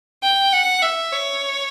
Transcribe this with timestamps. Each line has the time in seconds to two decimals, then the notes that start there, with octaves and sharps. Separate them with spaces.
0.23 G5
0.53 F#5
0.83 E5
1.13 C#5